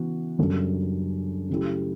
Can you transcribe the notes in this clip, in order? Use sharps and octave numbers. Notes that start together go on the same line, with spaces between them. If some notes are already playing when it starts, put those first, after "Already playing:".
Already playing: C#3 E3 B3 F#4
F#2 C#3 G3 D4 A4
C#3 F#3 A3 E4 G4